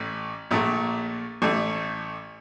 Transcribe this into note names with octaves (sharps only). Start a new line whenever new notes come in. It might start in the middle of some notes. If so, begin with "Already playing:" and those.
Already playing: A1 A2
A#1 A#2 A3
A1 A2 A3